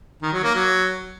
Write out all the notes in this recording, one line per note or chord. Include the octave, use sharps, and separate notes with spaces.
D#3
F#3
A#3
F#3